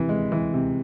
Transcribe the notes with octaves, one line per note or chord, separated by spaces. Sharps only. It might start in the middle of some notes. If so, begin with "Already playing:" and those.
Already playing: C3 E3
G#3
E3
C3